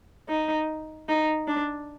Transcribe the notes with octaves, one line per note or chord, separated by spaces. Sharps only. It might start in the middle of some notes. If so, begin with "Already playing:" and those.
D#4
D#4
D4